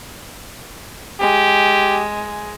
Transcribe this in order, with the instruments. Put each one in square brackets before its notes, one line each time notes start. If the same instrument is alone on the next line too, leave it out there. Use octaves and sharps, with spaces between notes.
[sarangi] G#3 [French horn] G4